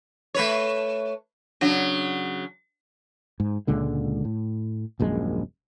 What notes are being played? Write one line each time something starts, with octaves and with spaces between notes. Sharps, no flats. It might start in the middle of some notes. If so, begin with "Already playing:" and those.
A3 B4 C#5
C#3 F#3 D4
G#2
C#2 A#2 D3 G#3
A2
D#1 A#1 F#2 G#3